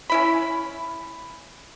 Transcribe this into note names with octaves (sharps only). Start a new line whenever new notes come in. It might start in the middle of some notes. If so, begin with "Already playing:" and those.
C#4 E4 B5